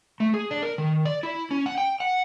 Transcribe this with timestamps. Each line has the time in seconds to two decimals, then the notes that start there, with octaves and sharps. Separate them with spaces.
0.20 A3
0.34 G#4
0.51 D4
0.63 A#4
0.78 D#3
1.05 D5
1.23 E4
1.51 C#4
1.66 F#5
1.78 G5
2.00 F#5